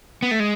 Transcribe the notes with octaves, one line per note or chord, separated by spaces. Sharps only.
B3
A3
G#3